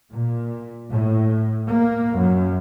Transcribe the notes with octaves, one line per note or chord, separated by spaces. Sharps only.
A#2
A2
A#3
F#2